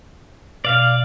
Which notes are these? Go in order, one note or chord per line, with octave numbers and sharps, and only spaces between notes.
B2 D5 F5 F6